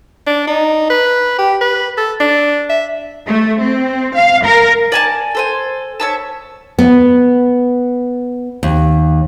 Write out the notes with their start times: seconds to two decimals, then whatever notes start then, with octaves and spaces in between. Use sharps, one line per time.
0.26 D4
0.47 D#4
0.90 B4
1.38 G4
1.61 B4
1.98 A4
2.20 D4
2.70 E5
3.26 A3
3.60 C4
4.15 F5
4.44 A#4
4.92 D5 G#5 A5
5.35 A4 C5 G#5
6.00 C#5 E5 A5
6.79 B3
8.63 D#2